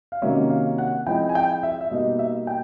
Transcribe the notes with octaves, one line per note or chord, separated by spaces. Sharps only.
F5
C3 D#3 F#3 A#3 C#4 E5
F5
F#5
F3 G#3 C4 E4 G5
G#5
G5
E5
E5
B2 G3 A#3 D#4 D#5
E5
G5